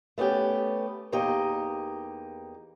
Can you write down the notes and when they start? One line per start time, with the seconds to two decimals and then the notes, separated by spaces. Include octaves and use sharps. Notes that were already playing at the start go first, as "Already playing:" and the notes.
0.18 A3 B3 C#4 G4
1.12 E2 A#3 D#4 G4 D#5